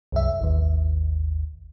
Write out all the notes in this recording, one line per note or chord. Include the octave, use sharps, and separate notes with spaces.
C2 F#2 E5
G#1 D#2